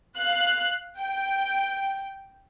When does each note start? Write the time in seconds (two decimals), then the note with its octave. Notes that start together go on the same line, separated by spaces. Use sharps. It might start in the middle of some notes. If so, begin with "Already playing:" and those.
0.17 F5 F#6
0.99 G5